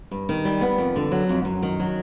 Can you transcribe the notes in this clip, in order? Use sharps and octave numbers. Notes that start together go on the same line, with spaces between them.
G2
D#3
G3
B3
F2
D3
F#3
F2
F#2
D#3
F#3